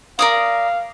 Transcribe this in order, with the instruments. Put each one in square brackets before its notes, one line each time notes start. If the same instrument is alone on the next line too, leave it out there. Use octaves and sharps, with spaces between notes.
[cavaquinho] A#4 D5 D#6 [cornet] F5